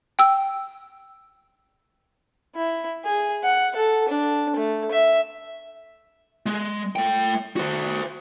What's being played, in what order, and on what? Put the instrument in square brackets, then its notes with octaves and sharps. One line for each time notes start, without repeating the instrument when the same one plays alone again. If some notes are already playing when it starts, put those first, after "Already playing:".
[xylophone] G5 E6
[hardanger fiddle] E4
G#4
F#5
A4
D4
A3
E5
[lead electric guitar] G#3
A3 G5
F#4 C5